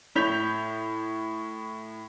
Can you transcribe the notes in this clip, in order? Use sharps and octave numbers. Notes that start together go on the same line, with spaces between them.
A2 C#5 G6 B6 F7